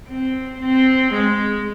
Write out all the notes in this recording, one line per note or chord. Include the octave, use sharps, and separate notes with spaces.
C4
C4
G#3